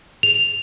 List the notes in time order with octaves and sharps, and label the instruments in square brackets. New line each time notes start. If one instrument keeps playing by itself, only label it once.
[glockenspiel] F7